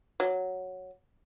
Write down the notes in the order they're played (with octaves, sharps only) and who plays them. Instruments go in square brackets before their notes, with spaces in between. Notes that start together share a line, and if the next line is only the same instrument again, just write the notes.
[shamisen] F#3